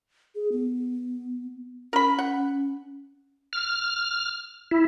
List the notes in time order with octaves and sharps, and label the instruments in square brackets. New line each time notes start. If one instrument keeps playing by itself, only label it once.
[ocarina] G#4
B3
[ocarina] C#4 [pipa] A#4 B5
[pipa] F#5
[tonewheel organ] F6
E4